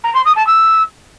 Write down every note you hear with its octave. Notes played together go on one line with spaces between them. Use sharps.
A#5
C6
D#6
A5
E6